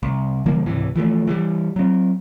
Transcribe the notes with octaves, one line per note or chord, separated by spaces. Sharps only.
C2
C#3 E3 G3 A#3
C#2 G#2 C3 E3
E3 F3 G3 A3
E3 F#3 G3
F#3 C4